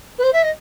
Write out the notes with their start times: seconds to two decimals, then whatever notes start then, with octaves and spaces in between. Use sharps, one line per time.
0.18 B4
0.23 C5
0.32 E5
0.42 D#5